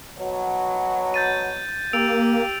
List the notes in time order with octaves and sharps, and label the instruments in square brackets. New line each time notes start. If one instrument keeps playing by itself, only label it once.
[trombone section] B2 F#3
[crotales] G6 A6 D#7
[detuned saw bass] A#3 [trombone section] G4 [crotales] E6 D7 F7